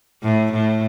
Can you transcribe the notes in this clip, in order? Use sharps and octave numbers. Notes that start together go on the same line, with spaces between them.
A2
A2